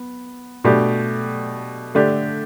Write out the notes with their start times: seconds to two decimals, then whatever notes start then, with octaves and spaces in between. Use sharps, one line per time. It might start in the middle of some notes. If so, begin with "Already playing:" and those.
Already playing: B3
0.64 B2 A3 D4 G4
1.95 D3 A3 D4 G4